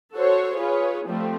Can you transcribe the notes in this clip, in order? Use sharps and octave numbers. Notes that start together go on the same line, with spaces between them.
F#4 A4 C5 C#5
F4 G#4 B4 C#5
F3 G3 A3 C4